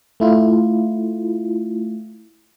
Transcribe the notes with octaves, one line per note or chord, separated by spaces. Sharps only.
A3 E4 F4